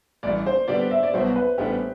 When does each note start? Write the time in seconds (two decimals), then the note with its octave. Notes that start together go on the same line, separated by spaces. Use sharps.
0.23 A1 G2 E3 D5
0.46 C5
0.68 D3 G3 B3 D4 G4 D5
0.91 E5
1.03 D5
1.13 C2 B2 F#3 B3 F#4 C5
1.36 B4
1.58 A1 A2 G3 B3 D4 G4